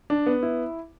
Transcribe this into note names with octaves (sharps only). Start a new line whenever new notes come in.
D4
B3
E4